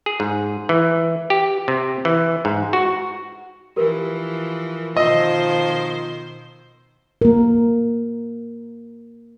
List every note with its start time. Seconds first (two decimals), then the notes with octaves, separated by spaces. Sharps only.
0.06 G#4
0.20 G#2
0.69 E3
1.30 G4
1.68 C3
2.05 E3
2.45 G#2
2.73 F#4
3.76 E3 F3 G4 A#4 B4
4.97 B2 D#3 F3 C5 D#5 E6
7.22 A#3 A#4